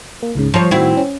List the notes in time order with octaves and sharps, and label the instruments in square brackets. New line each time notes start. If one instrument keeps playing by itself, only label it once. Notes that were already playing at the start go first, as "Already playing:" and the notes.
[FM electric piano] A#3
C#2 G#2 C#3
[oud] F3 C#5 [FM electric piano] A#5
[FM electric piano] A2 D#3 F#4 [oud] C4 E4
[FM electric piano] C#4